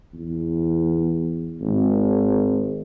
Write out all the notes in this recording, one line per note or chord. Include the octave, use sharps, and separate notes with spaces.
E2
G#1